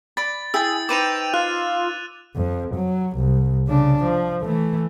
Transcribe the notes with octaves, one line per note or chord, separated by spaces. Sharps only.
D5 B5 A6
E4 G#4 G5 E6 A6
D#4 B4 C5 G5 D6 D#7 F7
F4 F#6
F2
F#3
C2
C#3 D4
F3
E3 A3